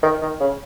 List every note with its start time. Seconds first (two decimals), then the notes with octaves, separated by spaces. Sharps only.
0.03 D#3
0.22 D#3
0.40 C#3